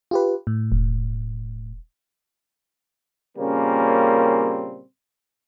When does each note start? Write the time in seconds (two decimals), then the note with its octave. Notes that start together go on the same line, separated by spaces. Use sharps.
0.11 F4 G4 B4
0.47 A2
0.72 E1
3.38 A#2 C#3 G3 A#3 C4 C#4